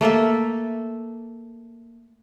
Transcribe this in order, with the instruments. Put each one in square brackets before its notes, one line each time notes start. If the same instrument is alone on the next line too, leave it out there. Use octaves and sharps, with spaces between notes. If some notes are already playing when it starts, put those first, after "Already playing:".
[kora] A3 A#3 A4 E5